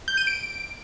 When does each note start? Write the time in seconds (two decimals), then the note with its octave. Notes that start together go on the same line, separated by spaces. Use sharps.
0.08 G6
0.17 D#7
0.27 D7